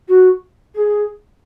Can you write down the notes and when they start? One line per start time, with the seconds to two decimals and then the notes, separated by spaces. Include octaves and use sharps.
0.08 F#4
0.75 G#4